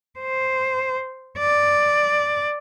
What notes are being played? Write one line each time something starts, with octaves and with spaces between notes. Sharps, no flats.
C5
D5